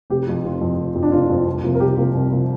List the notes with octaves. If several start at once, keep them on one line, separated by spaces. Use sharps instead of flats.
F1 G4
F2 F3
F1 F4
F2 F3
F1
F2 F3
D4
F1 F4
F2 F3
C2
C3 F3 A#3
A#4
C2 G4
C3 F3 A#3
C2
C3 F3 A#3